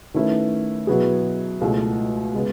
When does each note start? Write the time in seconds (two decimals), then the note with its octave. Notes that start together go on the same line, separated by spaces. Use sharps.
0.14 D#3 A3 C#4 E4 B4
0.87 B2 F#3 B3 E4 G#4
1.61 C#2 B2 A3 E4
2.34 C#3 G#3 B3